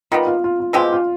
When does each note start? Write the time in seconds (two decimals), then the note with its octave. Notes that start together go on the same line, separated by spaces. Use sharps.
0.11 D#3 G3 B3 F4
0.27 F4
0.44 F4
0.60 F4
0.73 B2 G#3 C4 F4 G4
0.92 F4